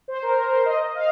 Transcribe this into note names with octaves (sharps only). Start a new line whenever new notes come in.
C5
A#4
A#4
C5
D#5
F5